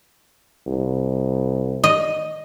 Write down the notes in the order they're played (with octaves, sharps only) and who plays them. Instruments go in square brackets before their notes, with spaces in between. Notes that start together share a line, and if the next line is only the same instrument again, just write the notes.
[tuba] C2
[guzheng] D#5